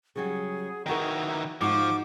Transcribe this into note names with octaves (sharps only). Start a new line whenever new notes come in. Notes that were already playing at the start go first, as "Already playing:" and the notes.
C#3 F#3 G3 G#4
D#3 E3 D#4 F#4 A#4 A#5
G#2 F3 D#4 F#4 D6